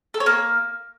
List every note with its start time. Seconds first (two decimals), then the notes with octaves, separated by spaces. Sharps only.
0.14 A4
0.20 C#5
0.26 A#3